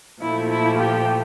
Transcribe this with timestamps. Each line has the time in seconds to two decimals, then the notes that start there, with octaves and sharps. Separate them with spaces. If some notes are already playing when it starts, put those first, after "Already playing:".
0.21 A#2 F3 A3 E4
0.50 E4
0.78 G4